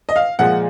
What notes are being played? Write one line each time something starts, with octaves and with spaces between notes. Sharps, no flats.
D#5
F5
A#2 F3 G#3 F#5